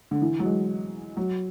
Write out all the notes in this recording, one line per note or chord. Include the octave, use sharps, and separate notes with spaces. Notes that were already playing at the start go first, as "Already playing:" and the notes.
D3
E3
F#3
G#3
F#3